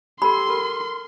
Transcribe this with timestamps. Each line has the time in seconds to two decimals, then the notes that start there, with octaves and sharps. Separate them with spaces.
0.22 G4 A4 B5 C6
0.50 A#4